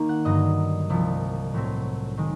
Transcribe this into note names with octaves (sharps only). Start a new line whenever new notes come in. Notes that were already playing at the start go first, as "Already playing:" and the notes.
Already playing: D#3 A#3
F#5
G2 D3 F#3 D#5
C2 C3 F3
A2 F#3 A3 C4
D#3 G#3